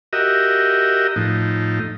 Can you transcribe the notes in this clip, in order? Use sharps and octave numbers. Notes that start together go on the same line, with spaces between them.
F#4 G4 A#4 D#5 E5
A2 F3 D#4